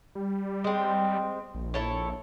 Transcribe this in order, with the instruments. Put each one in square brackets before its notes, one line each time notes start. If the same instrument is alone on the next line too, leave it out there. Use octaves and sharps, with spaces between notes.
[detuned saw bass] G3
[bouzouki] G#3 C4
[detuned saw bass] A#1
[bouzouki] E4 A4 C#5